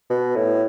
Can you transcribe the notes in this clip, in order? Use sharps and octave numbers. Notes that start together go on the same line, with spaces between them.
B2
A2